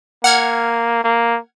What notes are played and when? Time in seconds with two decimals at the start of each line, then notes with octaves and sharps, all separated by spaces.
0.24 A#3 F#5 F6 G#6
1.04 A#3